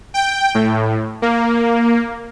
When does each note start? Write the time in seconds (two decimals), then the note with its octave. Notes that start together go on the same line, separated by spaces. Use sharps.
0.14 G5
0.55 A2
1.22 A#3